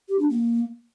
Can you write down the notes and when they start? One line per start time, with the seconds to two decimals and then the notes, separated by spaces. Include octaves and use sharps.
0.09 G4
0.19 D4
0.29 A#3